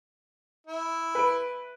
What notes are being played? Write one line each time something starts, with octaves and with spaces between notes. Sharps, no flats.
E4
B4 D7